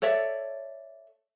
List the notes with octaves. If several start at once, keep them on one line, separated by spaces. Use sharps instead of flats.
A4 C#5 D5 E5